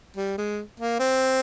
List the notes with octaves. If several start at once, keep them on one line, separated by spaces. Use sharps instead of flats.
G3
G#3
A#3
C4